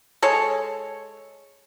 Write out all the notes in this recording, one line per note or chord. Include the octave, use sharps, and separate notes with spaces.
G#3 A4 C#5